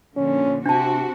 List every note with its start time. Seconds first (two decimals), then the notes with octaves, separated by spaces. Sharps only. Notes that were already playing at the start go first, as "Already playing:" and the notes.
0.16 A#2 D3 F3 C#4
0.66 C3 C4 D4 F#4 G4 A5